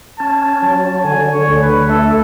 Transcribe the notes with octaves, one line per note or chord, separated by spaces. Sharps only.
C#4 A5
F#3 A5
D3 G#5
C#5
D2
B4
A3 A4